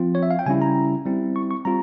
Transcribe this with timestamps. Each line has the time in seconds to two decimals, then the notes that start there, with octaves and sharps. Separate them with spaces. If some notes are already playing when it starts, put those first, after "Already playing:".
Already playing: F3 C4 F4
0.15 C#5
0.23 E5
0.31 F5
0.39 G5
0.46 C#3 G3 C#4 E4 G#5
0.62 A#5
1.06 G3 C4 E4
1.36 C#6
1.51 C#6
1.65 G3 C4 F4 A#5